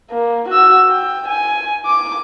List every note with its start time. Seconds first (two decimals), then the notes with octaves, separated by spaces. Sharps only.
0.11 A#3
0.48 F#4 E6
0.91 G5
1.28 G#5
1.86 D6